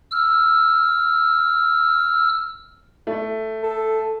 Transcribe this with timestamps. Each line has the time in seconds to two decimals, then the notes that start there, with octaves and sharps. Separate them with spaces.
0.11 E6 F6
3.07 A3
3.63 A4